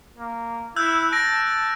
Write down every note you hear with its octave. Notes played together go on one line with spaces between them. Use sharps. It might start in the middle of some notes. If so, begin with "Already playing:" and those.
A#3
E4 E6 F#6 G6
A5 A#6 D7